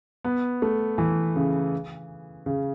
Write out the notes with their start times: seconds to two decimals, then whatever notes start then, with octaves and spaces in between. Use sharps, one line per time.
0.24 B3
0.62 A3
0.98 E3
1.36 C#3
2.46 C#3